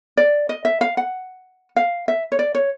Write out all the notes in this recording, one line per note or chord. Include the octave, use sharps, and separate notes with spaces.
D5
D#5
E5
F5
F#5
F5
E5
C#5
D5
C#5